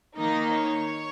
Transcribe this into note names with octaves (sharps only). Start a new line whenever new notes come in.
D#3 A#3 D#4 D#5
C#5